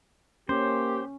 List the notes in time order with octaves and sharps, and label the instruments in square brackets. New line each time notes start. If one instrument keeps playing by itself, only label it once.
[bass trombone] A#3 [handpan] C#4 [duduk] G4 [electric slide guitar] C5